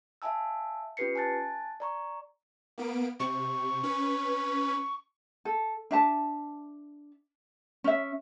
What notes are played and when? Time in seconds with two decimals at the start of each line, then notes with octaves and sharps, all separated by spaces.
0.22 E5 F5 G#5 A5 E6
0.97 C#4 F4 G4 B4 C7 C#7
1.15 G#5 A5 F#6 A6
1.80 D5 A#5 C#6
2.78 A#3 B3 D7
3.20 C3 C#6
3.83 C#4 B4
5.45 A4
5.91 D4 E5 A5
7.84 C#4 E5